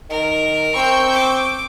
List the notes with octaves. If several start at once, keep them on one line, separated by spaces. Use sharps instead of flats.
D#3 A#4
C4 C#6 E6 G6
D6